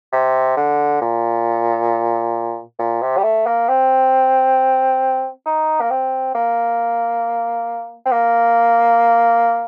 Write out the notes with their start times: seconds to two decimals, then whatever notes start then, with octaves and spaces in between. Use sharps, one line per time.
0.12 C3
0.57 D3
1.01 A#2
2.79 A#2
3.02 C3
3.18 G3
3.23 A3
3.46 A#3
3.68 C4
5.46 D#4
5.81 A#3
5.90 C4
6.35 A#3
8.05 C4
8.11 A#3